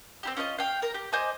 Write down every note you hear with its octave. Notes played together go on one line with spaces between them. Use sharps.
C4 E4 G4
C#4 F4 C#5 D#5
F5 G5
A#4 A#5
G4
C5 D#5 G#5 D6